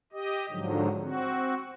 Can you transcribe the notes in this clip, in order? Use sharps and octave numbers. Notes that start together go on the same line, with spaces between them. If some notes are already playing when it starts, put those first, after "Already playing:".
G4 D#5
G#2 D3 F3 F#3
C4 F#4